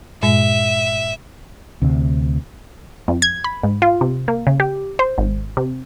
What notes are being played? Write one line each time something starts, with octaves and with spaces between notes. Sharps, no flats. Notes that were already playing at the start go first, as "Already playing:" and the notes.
G2 A#2 G#3 E5
D2 C3
F2
G#6
B5
G#2
F4
C3
A#3
C#3
G4
C5
G#1
C3